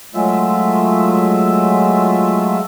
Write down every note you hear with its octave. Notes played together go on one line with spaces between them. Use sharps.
F#3 G#3 A3 F4 E5